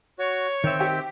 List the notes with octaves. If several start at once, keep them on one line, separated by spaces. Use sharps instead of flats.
F#4 C#5
D#3 C4 E5 G5
G4